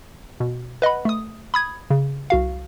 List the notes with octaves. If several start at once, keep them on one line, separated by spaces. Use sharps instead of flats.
B2
B4 D#5 F#5 B5
A3 D#6
B5 D#6 G#6
C#3
C2 F#4 F5